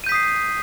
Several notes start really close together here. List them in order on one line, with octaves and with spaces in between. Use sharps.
D#7 G6 B6 D#6 C7